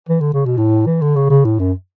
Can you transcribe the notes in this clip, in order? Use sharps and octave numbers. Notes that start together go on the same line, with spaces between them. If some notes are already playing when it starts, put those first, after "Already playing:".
E3
D3
C#3
B2
A2
E3
D3
C#3
C#3
A2
F#2